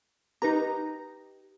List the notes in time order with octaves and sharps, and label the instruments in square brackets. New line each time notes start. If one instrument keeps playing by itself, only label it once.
[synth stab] D#4 A#5 [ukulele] G4 B4